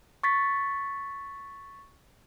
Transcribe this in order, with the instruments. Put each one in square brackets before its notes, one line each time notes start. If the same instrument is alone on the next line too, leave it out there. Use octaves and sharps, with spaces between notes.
[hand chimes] C#6 A6 B6